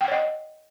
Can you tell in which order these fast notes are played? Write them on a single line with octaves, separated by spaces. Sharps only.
G5 F#5 C#5 D#5